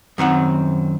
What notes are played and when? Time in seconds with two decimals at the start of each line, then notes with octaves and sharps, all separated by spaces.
0.18 F#2 D#3 C4 F#5